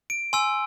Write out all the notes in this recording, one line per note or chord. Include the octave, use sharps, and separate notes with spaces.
D7
G#5 C6 E6